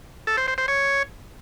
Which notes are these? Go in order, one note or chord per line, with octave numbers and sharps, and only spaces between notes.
A4
C5
C5
C5
C#5